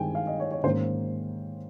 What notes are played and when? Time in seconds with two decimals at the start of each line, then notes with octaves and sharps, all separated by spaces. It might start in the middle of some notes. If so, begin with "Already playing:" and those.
Already playing: G2 D#3 G#3 C4 G5 G#5
0.15 F5
0.27 D#5
0.40 C#5
0.51 C#5
0.64 G#2 D#3 A#3 C#4 C5